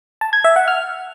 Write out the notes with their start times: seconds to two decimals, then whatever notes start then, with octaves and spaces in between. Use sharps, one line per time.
0.21 A5
0.33 G#6
0.44 E5
0.56 F#5
0.68 F6